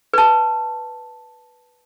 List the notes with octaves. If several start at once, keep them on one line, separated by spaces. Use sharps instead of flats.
B4 A5